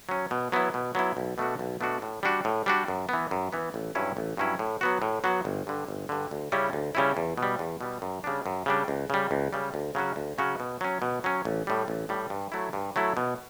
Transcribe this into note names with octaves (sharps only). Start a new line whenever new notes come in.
F#3 C#4
B2
F#3 B3 E4
B2
F#3 B3 E4
B1
B2 A3 D4 F#4
B1
B2 A3 D4 F#4
A2
G3 D4 F#4
A2
G3 D4 F#4
F#2
E3 B3
F#2
E3 B3
A1
G2 F#3 C#4 E4
A1
G2 F#3 C#4 E4
A2
F#3 B3 F#4
A2
F#3 B3 F#4
G1
G2 D3
G1
G2 D3
D2
C#3 G3 C#4 E4
D2
C#3 G3 C#4 E4
E2
B2
G3
E2
B2 G3
F#2
C#3 G3 D4
F#2
C#3 G3 D4
C#2
C#3 G3
C#2
C#3 G3
D2
C#3 F#3 C#4 F#4
D2
C#3 F#3 C#4 F#4
B2
F#3 C#4
B2
F#3 C#4
A1
A2 G3
A1
A2 G3
G2
F#3 A3 E4
G2
F#3 A3 E4
B2